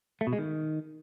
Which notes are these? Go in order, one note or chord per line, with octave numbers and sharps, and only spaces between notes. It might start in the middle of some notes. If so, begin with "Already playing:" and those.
A3
B2
G#3
D#3